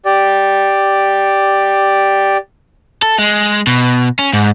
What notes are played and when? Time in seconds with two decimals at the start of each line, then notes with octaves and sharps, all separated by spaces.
0.05 G4 D5
3.03 A4
3.19 G#3
3.67 B2
4.19 C#4
4.33 G#2